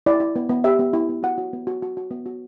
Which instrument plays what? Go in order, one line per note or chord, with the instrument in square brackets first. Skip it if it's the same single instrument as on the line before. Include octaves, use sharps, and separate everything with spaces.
[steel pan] E4 D5
E4
B3
B3
G4 E5
B3
E4
B3
F#4 F#5
F#4
B3
F#4
F#4
F#4
B3
F#4